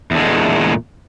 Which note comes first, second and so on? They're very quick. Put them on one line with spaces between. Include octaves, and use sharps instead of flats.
E2 D3 G#3 A3 A#2